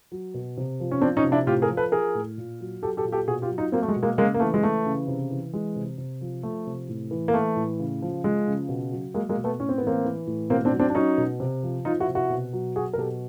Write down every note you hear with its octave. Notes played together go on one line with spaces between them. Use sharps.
F#3
B2
C3
F3
C#4
F3 C4 D4
C#4 D#4
C3
D4 E4
A2 F4 G4
G#4 A#4
F3
A4 B4
F3 G#4 A#4
A2
A#2
F#3
F#3 G4 A4
G4 A4
A#2
G4 A4
B2 F#4 G#4
F4 G4
F#3
D#4 F4
F#3 A#3 C4
A3
G#3
B2
G#3 A#3
C#3 G#3 A#3
A#3
E3 A3
G#3
E3 A3
C#3
C3
E3
E3 G#3
C3
C3
F3
F3 A3
C3
A2
E3
A#3
E3 A3
A2
C#3
F3
F3 G#3
C#3
B2
F#3
F#3 G#3 A#3
G#3 A#3
B2
A3 B3
A2 C#4
C4
B3
E3 A#3 C4
E3
A2
B2 A#3 C4
C4 D4
F#3
C4 D4
D4
F#3 C#4 D#4
B2
C3
F3
F3 D#4 F4
E4 F#4
C3
E4 F#4
B2
F#3
F#3 F#4 G#4
A#4
B2 G4 A4